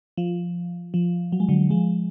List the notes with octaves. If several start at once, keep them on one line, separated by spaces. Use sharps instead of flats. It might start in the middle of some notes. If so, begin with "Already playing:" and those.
F3
F3
F#3
G#3
D3 F#3
F3 G#3